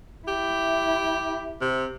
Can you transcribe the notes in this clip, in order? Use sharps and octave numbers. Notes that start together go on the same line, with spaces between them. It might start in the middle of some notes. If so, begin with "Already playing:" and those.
E4 G4
C3